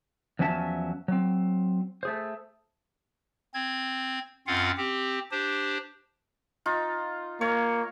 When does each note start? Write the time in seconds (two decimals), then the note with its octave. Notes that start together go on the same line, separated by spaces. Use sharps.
0.39 E2 F3 F#3 C#4 E5 A5
1.08 F#3 C4
2.03 A3 G#4 C5
3.54 C4 G#6
4.47 F#2 C4 F4 F5 F#5
4.77 C4 G4
5.31 D4 G4 C5
6.66 D#4 F4
7.41 A#3 C#5